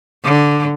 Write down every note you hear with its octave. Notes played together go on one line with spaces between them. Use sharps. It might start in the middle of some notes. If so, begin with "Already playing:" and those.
D3